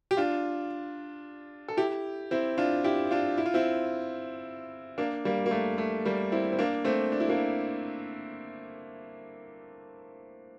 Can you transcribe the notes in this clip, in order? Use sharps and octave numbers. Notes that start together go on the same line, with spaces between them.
G4
D4 F4
A4
E4 G4
C4 E4
D4 F4
E4 G4
D4 F4
E4
F4
C4 E4
A#3 D4
G3 A#3
A#3
A3
A3
G3 A#3
C4 E4
C4
A#3 D4
A3 C4
D4
E4
A#3 D4